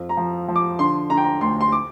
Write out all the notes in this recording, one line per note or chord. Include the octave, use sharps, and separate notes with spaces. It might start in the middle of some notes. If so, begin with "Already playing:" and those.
Already playing: F2
A#5
F3
F3
D6
D3 C6
D3 A#5
G5
A#5
D2 C6
C6
D6